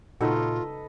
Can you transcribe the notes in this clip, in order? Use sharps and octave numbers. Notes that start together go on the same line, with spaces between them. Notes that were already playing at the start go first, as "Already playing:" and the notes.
A#2 C#3 D#4 F4 F#4 A4 B4 D#5